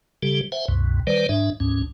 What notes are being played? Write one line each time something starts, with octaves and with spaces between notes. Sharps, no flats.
C#3 G3 G4 A4
C5 E5 F#5 G#5
C2 F#2 B2
D#3 G3 B4 C5 D5
G#2 D4 E5
D2 G#2 C#4